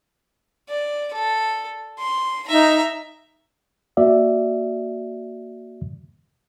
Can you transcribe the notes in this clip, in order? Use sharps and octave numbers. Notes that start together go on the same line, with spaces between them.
D5
A4
C6
D#4 E5 A#5
A#3 F#4 D5 E5